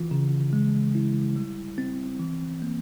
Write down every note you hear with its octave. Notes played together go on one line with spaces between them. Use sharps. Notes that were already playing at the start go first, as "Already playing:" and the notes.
Already playing: E3 F4
C#3
G#3
E4
G3
C4
E3
A#3